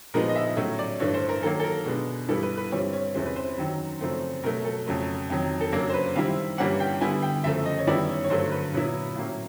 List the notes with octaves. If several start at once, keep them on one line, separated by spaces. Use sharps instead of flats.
A#2 F3 G#3 B3 D#4 A#4
D#5
E5
A2 F#3 A3 C#4 C#5
D5
G2 E3 A3 D4 C#5
C5
A#4
D#3 F#3 A#3 A4
A4
A#4
B2 G#3 B3 D4
G2 E3 G3 B3 E4 A4
B4
B4
G2 E3 G3 C4 C#5
C#5
E2 C3 E3 G#3 C#4 C5
B4
C5
F#2 D#3 F#3
F#2 C#3 F3 A3 C4
B2 F#3 A3 A#4
A4
F2 C#3 F#3 A3
F2 C3 D#3 F#3
A4
F#2 C#3 F#3 A#3 D4 A#4
C5
B4
C3 D#3 G3 C4 E4 F5
G2 E3 G3 A#3 C#4 F#5
G5
D3 G3 B3 E4 G#5
G5
F#2 C#3 F3 A3 E5
D#5
C#5
F#2 D#3 G3 B3 E4 D5
C#5
C#5
G2 D3 F#3 A3 C5
B4
A#2 F#3 B3 E4
A2 F#3 A#3 C#4